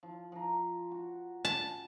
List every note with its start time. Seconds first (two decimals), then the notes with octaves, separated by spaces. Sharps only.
0.03 F3
0.32 F3 A#5
0.91 F#4
1.45 A5